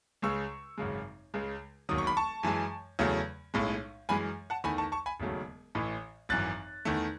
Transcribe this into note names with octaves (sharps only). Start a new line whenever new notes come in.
C#2 C#3 G#3 C#6 E6
G#1 F#2 C#3 G#3
C#2 C#3 G#3
E1 D#2 D#3 F#3 D#6
C#6
B5
A5 C#6
F#2 E3 G#3
E2 C#3 F#3 A3
B1 A2 G#3
F#2 E3 G#3 G#5 B5
F#5 A5
E2 D#3 A3 G#5 B5
A5 C#6
A5 C#6
G#5 B5
E1 D#2 C#3 F#3 A3
A1 A2 E3
G#1 F#2 E3 F#6 A6
E2 D#3 A3